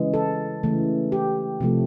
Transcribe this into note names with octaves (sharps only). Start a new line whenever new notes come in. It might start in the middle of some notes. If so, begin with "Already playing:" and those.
Already playing: C#3 E3 G#3
A4
C#3 E3 A3
G4
C3 F3 A3